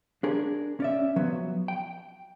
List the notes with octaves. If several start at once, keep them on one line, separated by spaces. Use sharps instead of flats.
D4 G#4 A#4
C#4 D5 E5
F3 F#3 B3
G5